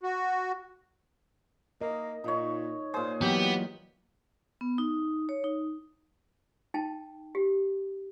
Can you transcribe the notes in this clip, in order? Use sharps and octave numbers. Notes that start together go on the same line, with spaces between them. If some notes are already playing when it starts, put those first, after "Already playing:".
F#4
A#3 D#5
A#2 D#4 C#5
A#2 G#4 C5
E3 F#3 B3 G4 G5 A#5
B3
D#4
C#5
D#4
D#4 G5 A5
G4